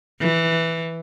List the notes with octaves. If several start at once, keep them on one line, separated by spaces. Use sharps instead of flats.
E3